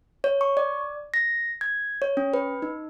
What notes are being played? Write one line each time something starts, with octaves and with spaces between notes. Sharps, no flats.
C#5
C#6
D5
A#6
G#6
C#5
C#4
B4
D#4